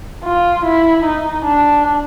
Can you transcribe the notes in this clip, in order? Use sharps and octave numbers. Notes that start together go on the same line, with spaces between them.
F4
E4
D#4
D4